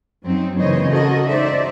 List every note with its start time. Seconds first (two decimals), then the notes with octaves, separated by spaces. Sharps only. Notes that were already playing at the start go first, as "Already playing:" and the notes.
0.23 F#2 F#3 C4 D#4
0.58 C#3 E3 A#3 C5 C#5 D#5
0.91 F#4 A4 A#4 D#5
1.27 G#3 D#4 C5 D5 E5